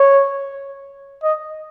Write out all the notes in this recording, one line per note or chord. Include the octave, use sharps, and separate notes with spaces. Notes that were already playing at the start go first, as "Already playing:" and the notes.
Already playing: C#5
D#5